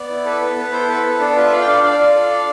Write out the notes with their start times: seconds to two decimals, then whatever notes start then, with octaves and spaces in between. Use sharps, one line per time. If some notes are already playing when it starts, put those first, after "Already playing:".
Already playing: B3 D5
0.10 E4
0.26 A4 B4
0.41 B3 B4
0.57 B3 B4
0.72 E4 A4 C5
0.89 A4 B4
1.04 B3
1.20 D4 A4
1.36 F4 B4
1.46 E5
1.52 A4 D5 F5
1.61 G5
1.67 D4 D5 F5
1.83 D4 D5 F5
2.00 F4
2.15 A4
2.31 D4